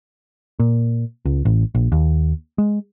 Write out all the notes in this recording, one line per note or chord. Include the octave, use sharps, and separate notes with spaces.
A#2
C#2
A1
A#1
D#2
G#3